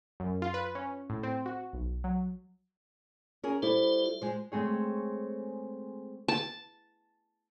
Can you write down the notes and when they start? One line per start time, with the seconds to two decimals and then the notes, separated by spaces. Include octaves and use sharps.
0.20 F#2
0.42 F4
0.54 B4
0.75 C#4
1.10 A2
1.23 C4
1.46 F#4
1.73 B1
2.04 F#3
3.43 C#4 G#4 A#4
3.63 G3 E4 A4 C5
4.06 F4
4.22 G#3 C5
4.52 G#3 A3 C4 G#4 C#5
6.28 A5